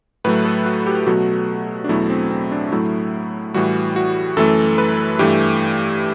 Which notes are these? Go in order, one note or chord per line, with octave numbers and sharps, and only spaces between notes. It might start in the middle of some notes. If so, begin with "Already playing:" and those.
A2 F#3 A3 B4
A4
F#4
G4
B2 F#3 A3 F#4
D4
E2 B2 F#3 A3 E4
C4
C4
D4
A2 F#3 A3 E4
A2 E3 G3 F#4
F#4
F#2 E3 A3 A4
B4
G2 E3 A3 G4